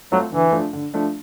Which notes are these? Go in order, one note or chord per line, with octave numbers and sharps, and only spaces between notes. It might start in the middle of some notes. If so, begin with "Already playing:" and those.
F#3 A3 C4 F4
D3 E3
F3 A3 D4
D3
F3 A3 D4